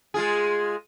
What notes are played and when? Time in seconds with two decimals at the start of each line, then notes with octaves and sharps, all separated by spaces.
0.14 G#3 F4 G#4